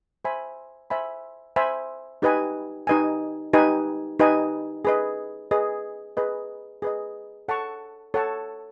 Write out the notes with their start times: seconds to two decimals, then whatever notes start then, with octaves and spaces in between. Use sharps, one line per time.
0.25 C5 E5 G#5 B5
0.90 C5 E5 G#5 B5
1.56 C5 E5 G#5 B5
2.22 D#4 G4 B4 D#5 G#5
2.87 D#4 G4 B4 D#5 G#5
3.53 D#4 G4 B4 D#5 G#5
4.19 D#4 G4 B4 D#5 G#5
4.85 G#4 B4 D#5
5.51 G#4 B4 D#5
6.17 G#4 B4 D#5
6.82 G#4 B4 D#5
7.48 A4 C#5 F#5 A5 C#6
8.14 A4 C#5 F#5 A5 C#6